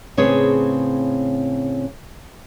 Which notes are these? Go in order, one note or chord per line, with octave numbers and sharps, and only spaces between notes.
A2 C#3 C4 G#4 B4 C#5